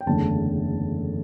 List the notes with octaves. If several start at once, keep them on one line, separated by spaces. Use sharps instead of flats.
G5
F#1 E2 D3 A3 A5